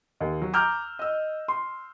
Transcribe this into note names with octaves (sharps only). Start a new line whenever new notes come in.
D#2
F#3
A#5 D6 E6 F6 G6
D#5 E6
C6